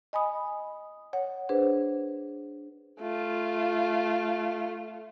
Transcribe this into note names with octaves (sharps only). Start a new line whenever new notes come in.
D#5 G#5 B5 D#6
C#5 F#5
D4 G#4 B4 C5
A3 F4